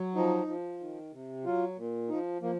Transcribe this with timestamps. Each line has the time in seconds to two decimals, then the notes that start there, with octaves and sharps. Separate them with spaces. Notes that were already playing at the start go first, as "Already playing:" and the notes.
Already playing: F#3
0.15 F3 D#4
0.47 F3
0.80 D#3
1.13 C3
1.44 F#3 F4
1.77 A#2
2.09 F3 D#4
2.42 F3 A#3